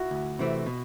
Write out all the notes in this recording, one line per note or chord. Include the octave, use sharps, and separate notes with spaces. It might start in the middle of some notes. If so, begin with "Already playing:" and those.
Already playing: E4 F#4
D2
C3 E3 A3 C4
B2